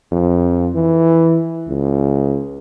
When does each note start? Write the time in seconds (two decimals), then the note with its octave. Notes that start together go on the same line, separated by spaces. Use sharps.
0.12 F2
0.75 E3
1.69 C#2